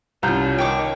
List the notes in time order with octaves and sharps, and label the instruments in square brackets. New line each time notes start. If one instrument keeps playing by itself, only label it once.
[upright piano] C2 G6 [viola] C#4 F4 [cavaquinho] A#5
[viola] D#3 C#5 [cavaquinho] G5 C#6 D6